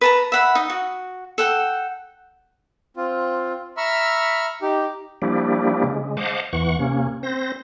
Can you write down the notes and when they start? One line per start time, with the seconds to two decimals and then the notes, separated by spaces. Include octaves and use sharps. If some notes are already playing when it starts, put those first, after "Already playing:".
0.01 B4 A5 A#5
0.32 E5 F#5 B5
0.55 D#4
0.70 F#4
1.38 A4 F#5 G5
2.97 C4 F4
3.77 E5 A#5 B5 C#6 E6 F6
4.62 D#4 G4
5.22 F3 G3 A#3 D4 E4 G4
5.84 C#3 G#3
6.17 C5 D#5 F5 F#5 A5 D6
6.53 E2 E3 F#5 C#6
6.79 C3 A#3 C#4
7.23 C4 C5 A#6